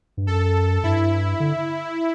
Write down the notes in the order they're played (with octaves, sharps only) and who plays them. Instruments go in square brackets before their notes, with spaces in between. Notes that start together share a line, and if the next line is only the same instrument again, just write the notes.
[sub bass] G2
[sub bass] F#2 [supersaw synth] A4
[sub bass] G2 [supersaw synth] E4
[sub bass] D3